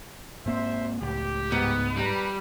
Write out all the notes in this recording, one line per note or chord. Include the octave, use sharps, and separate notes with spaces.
G#2 A#3 C4 C5 E5
C#2 A2 G4
G#2 B3
G3 B4 A#5